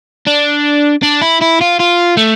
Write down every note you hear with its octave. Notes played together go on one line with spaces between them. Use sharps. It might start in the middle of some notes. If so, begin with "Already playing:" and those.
D4
D4
E4
E4
F4
F4
A3